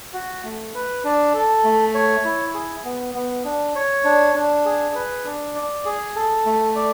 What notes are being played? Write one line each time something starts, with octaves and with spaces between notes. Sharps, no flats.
F#4
A3
B4
D4
A4
A3
C#5
E4
G#4
B3
B3
D4
C#5
D4
D4
G#4
B4
D4
D5
G#4
A4
A3
D5